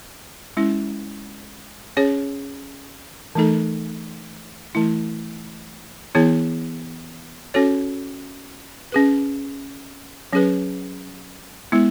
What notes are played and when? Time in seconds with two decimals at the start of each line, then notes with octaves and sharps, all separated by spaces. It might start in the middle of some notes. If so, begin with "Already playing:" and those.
0.57 G#3 C#4 E4
1.97 C#4 G#4 C#5
3.35 E3 A3 D#4 A4
4.75 E3 A3 E4
6.15 E3 B3 E4 G#4 C#5
7.54 C#4 F#4 A4 C#5
8.92 C#4 G#4 B4
10.33 F#3 C#4 G#4 B4
11.72 G#3 B3 E4